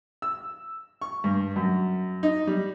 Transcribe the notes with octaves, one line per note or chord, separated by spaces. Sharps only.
E6
C#6
G2
F#2
D#4
G3